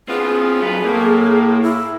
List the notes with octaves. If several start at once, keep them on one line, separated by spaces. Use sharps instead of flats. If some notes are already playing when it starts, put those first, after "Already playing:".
B3 C4 D4 F4 G#4
F#3 F4 A4 B4
A2 A#3
E4